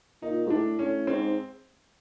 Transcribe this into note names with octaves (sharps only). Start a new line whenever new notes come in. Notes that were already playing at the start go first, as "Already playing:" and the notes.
A#2 D#4
G#2
A2 D4
A2 C#4
G#2 C4